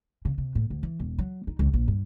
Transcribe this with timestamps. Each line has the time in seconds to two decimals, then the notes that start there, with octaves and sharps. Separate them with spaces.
0.25 C#3
0.38 C3
0.55 A2
0.70 D2
0.83 E3
1.00 E1
1.19 F#3
1.47 D#4
1.59 C#2
1.74 A#1
1.88 G2